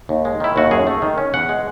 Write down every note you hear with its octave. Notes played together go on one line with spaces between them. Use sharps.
D#2
G#3
D#3 E4
D#2 F#4
F#2 G#4
A3
D#3
C#4
E2 F#5
G#3